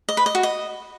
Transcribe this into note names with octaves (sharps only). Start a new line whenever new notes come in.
D#5
B4
D#5
F#4
D#5